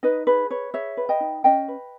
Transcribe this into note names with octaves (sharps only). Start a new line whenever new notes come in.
D#4 B4 D#5
G#4 B4
B4 C#5
G#4 C#5 E5
B4
D#5 G5
D#4
C#4 D#5 G5
B4